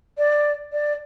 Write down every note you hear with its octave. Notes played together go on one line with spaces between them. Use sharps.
D5
D5